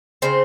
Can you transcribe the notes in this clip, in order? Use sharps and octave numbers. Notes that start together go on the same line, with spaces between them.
C#3 C4 C5